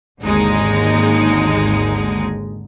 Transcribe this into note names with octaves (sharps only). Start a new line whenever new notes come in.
G#1 D#2 D3 G#3 D#4